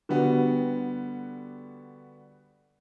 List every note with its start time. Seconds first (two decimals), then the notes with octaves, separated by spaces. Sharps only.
0.09 D3 G3 B3 F#4